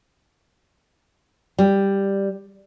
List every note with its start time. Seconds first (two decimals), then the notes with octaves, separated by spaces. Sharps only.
1.58 G3